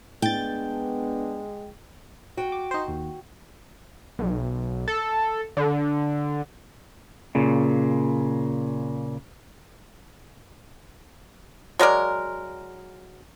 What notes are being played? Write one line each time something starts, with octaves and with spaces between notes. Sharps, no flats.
A2 G#3 B3 D4 G5 A6
F#4 G5
D6
D#4 C5
D#2
B1
A4
D3
A#2 C#3
F#3 G#3 A#4 D5